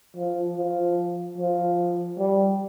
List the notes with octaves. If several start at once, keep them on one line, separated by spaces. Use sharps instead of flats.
F3
F3
F3
G3